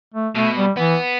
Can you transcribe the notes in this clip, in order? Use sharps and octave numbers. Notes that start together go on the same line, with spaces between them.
A3
B2 A3
G3
E3 B3